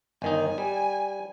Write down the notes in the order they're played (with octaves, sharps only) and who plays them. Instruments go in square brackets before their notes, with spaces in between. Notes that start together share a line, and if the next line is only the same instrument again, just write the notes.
[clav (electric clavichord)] G1 D#3 D#4 [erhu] G#5
[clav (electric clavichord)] G3